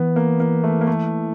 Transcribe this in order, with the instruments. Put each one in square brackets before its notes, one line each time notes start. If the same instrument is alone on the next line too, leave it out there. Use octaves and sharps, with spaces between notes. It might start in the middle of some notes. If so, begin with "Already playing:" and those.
Already playing: [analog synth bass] E3 [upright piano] B3
[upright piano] A#3
A#3
A3
A#3
A3